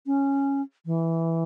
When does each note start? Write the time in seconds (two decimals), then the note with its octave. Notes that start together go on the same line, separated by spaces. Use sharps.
0.06 C#4
0.86 E3